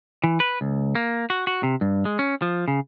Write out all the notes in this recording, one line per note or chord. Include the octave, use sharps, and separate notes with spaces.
E3
B4
C#2
A#3
F#4
F#4
C3
G2
G#3
C#4
F3
C#3